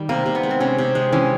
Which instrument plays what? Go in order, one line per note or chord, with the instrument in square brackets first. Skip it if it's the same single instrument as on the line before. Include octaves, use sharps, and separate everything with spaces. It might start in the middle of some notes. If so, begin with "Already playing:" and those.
Already playing: [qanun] D#3 G3
[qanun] C3 [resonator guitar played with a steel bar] A#3
[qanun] C3
[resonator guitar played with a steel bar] B3
[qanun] G#3
[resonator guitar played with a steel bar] C4
[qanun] C3 [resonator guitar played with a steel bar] C#4
[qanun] C3
G#3
[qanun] E3 [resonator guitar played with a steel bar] C#4